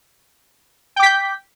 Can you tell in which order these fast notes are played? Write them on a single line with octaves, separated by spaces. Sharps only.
G5 D6 B6 G6